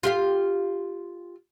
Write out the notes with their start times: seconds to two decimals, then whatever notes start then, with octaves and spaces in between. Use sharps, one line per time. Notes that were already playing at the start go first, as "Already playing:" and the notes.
0.03 F4 G4 F5